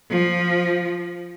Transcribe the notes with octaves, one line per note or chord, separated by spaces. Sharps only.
F3